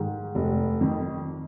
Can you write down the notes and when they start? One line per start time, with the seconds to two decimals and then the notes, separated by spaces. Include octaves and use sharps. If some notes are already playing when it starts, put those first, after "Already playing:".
Already playing: G#2 D#3
0.35 F1
0.81 F2 D#3